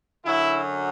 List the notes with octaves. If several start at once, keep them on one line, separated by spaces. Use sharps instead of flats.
F#2 D3 F#3 E4